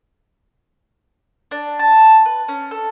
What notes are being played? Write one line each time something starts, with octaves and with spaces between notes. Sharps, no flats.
D4
A5
B4
C#4
A4